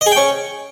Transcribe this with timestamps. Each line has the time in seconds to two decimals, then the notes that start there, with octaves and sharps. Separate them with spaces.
0.01 D#5
0.06 G#4
0.11 G5
0.16 C#4